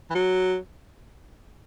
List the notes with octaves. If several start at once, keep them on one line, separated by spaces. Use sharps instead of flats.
E3
F#3